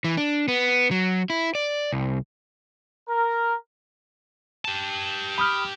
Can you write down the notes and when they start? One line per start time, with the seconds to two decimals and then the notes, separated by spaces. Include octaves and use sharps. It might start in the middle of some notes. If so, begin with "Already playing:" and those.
0.04 E3
0.17 D4
0.48 B3
0.91 F#3
1.30 E4
1.55 D5
1.93 C2
3.09 A#4
4.65 G4 A5
5.38 B5 D#6 F6